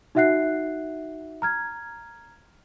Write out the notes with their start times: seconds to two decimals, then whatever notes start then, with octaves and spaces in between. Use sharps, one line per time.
0.15 D#4 F#4 E5 F#5 F#6 C7
1.42 A#5 F6 G#6